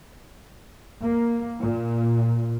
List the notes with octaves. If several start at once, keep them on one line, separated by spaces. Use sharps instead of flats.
A#3
A#2